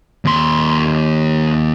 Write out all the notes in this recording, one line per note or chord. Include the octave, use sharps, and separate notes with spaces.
D#2 C6